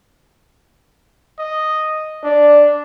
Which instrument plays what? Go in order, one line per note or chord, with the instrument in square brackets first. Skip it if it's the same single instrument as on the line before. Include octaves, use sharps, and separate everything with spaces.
[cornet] D#5
[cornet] D4 [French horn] D5